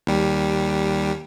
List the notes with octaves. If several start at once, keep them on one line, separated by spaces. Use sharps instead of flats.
D#2 G3